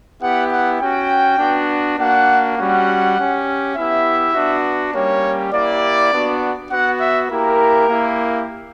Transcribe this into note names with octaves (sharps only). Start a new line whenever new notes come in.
B3 E4 G4 F#5
F#5
C#4 F#4 G5
B3 D4 F#4
A#3 D4 F#4 F#5
G3 C#4 F#4 F#5
C#4 G4
B3 E4 G4 E5
B3 D4 F#4
G3 A#3 C#4 G4 C#5
A#3 E4 G4 D5
B3 D4 F#4
B3 F#4 F#5
E5
A#3 E4 G4 A#4
A#3 E4 G4